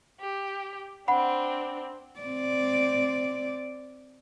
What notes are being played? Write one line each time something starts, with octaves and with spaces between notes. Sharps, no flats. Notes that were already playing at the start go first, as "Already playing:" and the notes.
G4
C4 D4 F#5 B5
C4 D5